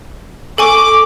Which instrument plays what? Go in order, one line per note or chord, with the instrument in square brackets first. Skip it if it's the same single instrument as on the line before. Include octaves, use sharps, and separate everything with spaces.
[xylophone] A4 G#5 C#6 [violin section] D6